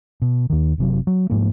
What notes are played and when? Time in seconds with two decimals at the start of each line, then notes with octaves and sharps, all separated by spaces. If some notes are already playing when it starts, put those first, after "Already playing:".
0.22 B2
0.50 D#2 D#3
0.78 F#1 C3 F#3
1.07 F#3
1.30 G#2 F3 A3 A#3